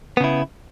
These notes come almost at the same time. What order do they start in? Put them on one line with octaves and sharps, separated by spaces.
B3 C#3 E4